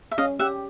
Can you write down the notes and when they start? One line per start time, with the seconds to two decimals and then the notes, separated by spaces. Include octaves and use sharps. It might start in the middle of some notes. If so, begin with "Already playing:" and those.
0.11 E5
0.18 C#4 D#5 F5
0.39 G4 E5 F#5